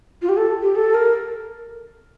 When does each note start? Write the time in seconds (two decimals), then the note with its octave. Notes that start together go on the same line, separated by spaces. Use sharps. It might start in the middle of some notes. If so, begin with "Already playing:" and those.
0.22 F4
0.29 G4
0.37 A4
0.62 G4
0.76 A4
0.94 A#4